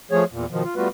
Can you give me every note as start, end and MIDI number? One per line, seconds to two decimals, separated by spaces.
0.11 0.24 53
0.11 0.24 57
0.11 0.24 68
0.11 0.24 73
0.32 0.45 40
0.32 0.45 46
0.51 0.63 47
0.51 0.63 51
0.51 0.63 53
0.64 0.75 65
0.76 0.88 55
0.76 0.88 57
0.76 0.88 59
0.76 0.88 65
0.76 0.88 66
0.76 0.88 71